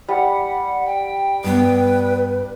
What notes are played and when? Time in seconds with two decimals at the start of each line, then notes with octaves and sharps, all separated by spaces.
0.08 G3 F#5
0.86 G5
1.44 G2 B3 B4